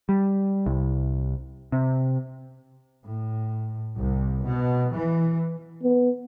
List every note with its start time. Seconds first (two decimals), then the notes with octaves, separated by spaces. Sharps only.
0.09 G3
0.66 C2
1.72 C3
3.05 A2
3.96 C2
4.46 B2
4.93 E3
5.83 B3